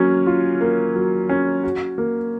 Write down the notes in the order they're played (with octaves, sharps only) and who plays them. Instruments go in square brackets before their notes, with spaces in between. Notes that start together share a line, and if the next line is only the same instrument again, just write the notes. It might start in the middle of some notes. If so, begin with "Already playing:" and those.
Already playing: [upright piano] F#3 A#3 C#4
F4
A#3
F#3
C#4
F#4
A#3